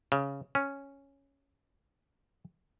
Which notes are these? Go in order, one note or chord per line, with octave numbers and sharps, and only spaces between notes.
C#3
C#4